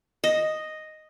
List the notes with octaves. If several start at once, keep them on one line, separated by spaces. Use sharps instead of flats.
D#5